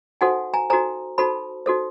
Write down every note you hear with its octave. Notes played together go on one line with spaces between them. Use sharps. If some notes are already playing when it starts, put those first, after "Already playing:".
D#4 F#4 A4 C5 F#5 G#5
G#5 A#5
D#4 F#4 A4 C5 G#5 A#5
D#4 F#4 A4 C5 A5 B5
D#4 F#4 A4 C5